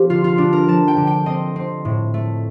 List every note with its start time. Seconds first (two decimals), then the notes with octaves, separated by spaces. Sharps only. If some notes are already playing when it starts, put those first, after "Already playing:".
Already playing: F3 C4 G4
0.09 D3 F4
0.24 F4
0.38 D3 D4
0.53 A#4
0.68 F3 A5
0.88 G5
0.97 D3
1.07 G5
1.26 C4 D#5
1.56 C4
1.85 A2
2.14 A3